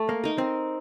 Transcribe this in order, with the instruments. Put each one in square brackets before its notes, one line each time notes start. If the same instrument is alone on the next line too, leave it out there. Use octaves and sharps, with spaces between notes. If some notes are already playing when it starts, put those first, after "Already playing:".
Already playing: [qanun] A3
[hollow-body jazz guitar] A#3
[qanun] D#4 A#4
[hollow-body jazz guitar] C4